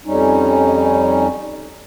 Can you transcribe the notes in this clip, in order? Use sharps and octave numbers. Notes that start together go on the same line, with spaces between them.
F2 G3 C#4 D#4